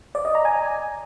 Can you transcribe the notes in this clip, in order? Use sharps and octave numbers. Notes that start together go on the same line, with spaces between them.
D5
D#5
A#5
G#5